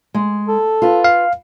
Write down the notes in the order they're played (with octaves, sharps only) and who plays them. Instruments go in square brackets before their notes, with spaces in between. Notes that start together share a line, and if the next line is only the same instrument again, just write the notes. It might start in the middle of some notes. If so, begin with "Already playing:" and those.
[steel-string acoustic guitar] G#3
[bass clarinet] A4
[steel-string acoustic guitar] F4 B4
[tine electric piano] F5